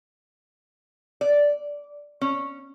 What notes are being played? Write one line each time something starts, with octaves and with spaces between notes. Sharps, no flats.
D5
C#4